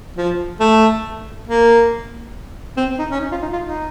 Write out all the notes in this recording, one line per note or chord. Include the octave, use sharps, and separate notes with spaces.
F3
A3
A#3
C4
D#4
C#4
D#4
F4
D#4
F4
D#4